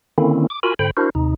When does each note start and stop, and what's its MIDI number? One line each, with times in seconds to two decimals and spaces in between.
0.18 0.47 50
0.18 0.47 51
0.18 0.47 58
0.18 0.47 60
0.18 0.47 61
0.18 0.47 64
0.50 0.60 86
0.63 0.74 65
0.63 0.74 66
0.63 0.74 70
0.63 0.74 80
0.63 0.74 83
0.79 0.91 44
0.79 0.91 50
0.79 0.91 72
0.79 0.91 79
0.79 0.91 83
0.97 1.10 62
0.97 1.10 64
0.97 1.10 66
0.97 1.10 70
0.97 1.10 72
1.15 1.34 39
1.15 1.34 48
1.15 1.34 63